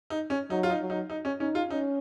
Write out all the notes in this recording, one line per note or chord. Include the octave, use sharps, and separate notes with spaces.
D#4
C#4
F#3 D#4
F4
D#4
F#3
D#4
D#4
C#4
C#4 D#4
F4
C#4 D#4